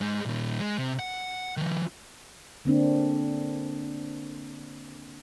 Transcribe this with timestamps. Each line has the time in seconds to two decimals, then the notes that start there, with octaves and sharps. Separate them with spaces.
0.01 G#2 G#3
0.25 A#2 D#3
0.60 G#3
0.78 C3
0.99 F#5
1.57 D#3 F3
2.65 D3 A#3 C4 D4